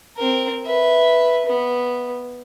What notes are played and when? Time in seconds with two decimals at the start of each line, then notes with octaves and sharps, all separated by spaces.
0.17 C4 A#4
0.65 B4 E5
1.47 B3